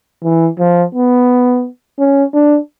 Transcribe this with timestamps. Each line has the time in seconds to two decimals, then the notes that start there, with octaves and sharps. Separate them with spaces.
0.24 E3
0.59 F3
0.95 B3
1.99 C#4
2.34 D4